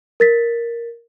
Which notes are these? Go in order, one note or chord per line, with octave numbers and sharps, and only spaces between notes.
A#4 A6 B6